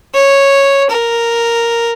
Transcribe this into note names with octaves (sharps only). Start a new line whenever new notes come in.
C#5
A#4